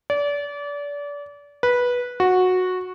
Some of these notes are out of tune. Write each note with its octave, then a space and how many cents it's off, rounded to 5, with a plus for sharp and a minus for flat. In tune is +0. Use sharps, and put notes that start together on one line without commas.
D5 -30
B4 -15
F#4 -10